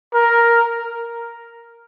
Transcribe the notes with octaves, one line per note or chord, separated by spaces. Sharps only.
A#4